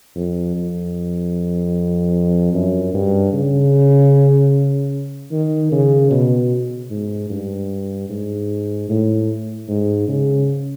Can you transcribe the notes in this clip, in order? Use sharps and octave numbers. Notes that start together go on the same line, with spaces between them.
F2
F2
F#2
G2
C#3
D#3
C#3
B2
G#2
G2
G#2
A2
G#2
C#3